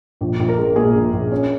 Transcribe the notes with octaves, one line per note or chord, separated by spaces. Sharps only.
A#1
A#1
A#4
G#3
A#2 G#4
A#1
A#1
C#4